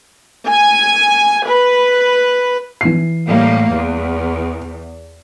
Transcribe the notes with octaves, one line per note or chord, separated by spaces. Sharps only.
G#5
B4
E3 C7
A2 G3 A#3
E2